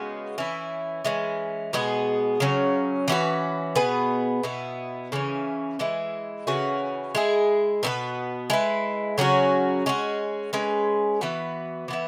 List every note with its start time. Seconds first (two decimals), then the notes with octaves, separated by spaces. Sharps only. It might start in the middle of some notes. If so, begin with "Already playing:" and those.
Already playing: C#3 G#3 B3 F#4
0.38 E3 C#4 E4
1.05 E3 G#3 C#4
1.73 B2 G#3 B3 G#4
2.40 C#3 F#3 C#4
3.08 E3 C#4 F#4 B4
3.75 B2 B3 G#4 B4
4.43 B2 B3 E4
5.12 C#3 E3 C#4
5.79 E3 G#3 E4
6.47 C#3 E3 C#4 F#4
7.15 G#3 E4 G#4
7.83 B2 B3 E4 B4
8.50 G#3 E4 B4
9.18 C#3 F#3 C#4 F#4
9.86 G#3 C#4 F#4
10.53 G#3 C#4 G#4 B4
11.21 E3 B3 F#4 B4
11.88 E3 B3 E4